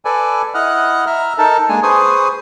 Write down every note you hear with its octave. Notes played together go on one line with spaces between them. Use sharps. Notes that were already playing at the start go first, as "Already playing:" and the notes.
A4 B4 D5 G#5
E4 D#5 F#5 F6 F#6
E5 A#5 F6
D#4 A4 A#4 A5
G#3 A#3 D4 G#5
G#4 B4 C5 G#5 C#6 D#6